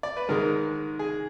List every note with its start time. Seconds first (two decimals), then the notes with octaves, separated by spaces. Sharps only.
0.03 D5
0.17 B4
0.28 G#2 D#3 G#3 A#4
0.99 G#4